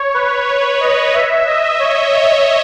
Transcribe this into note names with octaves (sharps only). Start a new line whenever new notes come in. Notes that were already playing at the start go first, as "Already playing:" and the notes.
Already playing: C#5
B4
C#5
D#5
E5
D#5
C#5
C#5